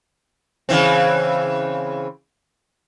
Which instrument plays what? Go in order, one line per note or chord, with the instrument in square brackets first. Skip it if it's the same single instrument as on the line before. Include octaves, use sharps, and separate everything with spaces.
[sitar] C#3 E3 C4